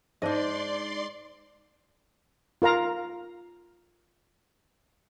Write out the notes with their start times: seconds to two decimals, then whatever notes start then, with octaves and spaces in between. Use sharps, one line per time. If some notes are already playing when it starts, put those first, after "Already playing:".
0.22 G#2 D4 D#4 D5 D#5 C6
2.62 F4 A#4 F5 A#5